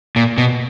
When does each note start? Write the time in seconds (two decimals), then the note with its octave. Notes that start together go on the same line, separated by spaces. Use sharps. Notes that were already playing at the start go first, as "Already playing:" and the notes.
0.16 A#2
0.38 B2